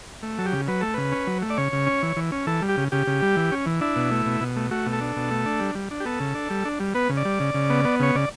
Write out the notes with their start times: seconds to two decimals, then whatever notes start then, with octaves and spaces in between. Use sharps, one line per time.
0.23 A3
0.38 F#3 A4
0.46 G4
0.53 C#3
0.68 F#3 B4
0.81 A3 A4
0.94 C#3 B4
1.12 C#4
1.27 F#3
1.42 A3
1.50 D5
1.57 C#3 C#5
1.72 C#3
1.87 C#4
2.02 E3
2.17 E3
2.32 C#4
2.47 E3 A4
2.62 G3
2.69 G4
2.77 C#3
2.92 C#3 G4
3.07 C#3
3.22 G3
3.36 E3
3.52 C#4
3.66 E3
3.81 D4 E4
3.96 B2
4.11 A3
4.26 B2
4.41 B2
4.56 A3
4.71 A3 F#4
4.86 B2
4.93 A4
5.01 D4
5.16 B2
5.31 A3
5.46 D4
5.60 G3
5.75 G3
5.91 D4
6.00 G4
6.05 B3 A4
6.20 C#3
6.35 D4
6.50 G3
6.65 D4
6.80 G3
6.94 B3 B4
7.09 C#3
7.17 D5
7.25 G3
7.40 C#3
7.54 C#3
7.70 B3
7.85 B3
8.00 C#3 C#5
8.15 C#3 D5